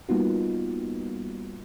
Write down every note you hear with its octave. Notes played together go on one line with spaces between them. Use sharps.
G3 A#3 B3 D#4 F4 F#4